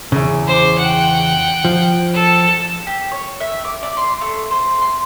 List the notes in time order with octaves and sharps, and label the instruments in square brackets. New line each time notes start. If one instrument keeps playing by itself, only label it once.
[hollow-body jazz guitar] E2 C#3
[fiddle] C5 D6
F#5 G5
[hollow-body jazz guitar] F3
[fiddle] A4
[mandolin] G4
C#5
E5
D6
D5
C6
A3
C5
C6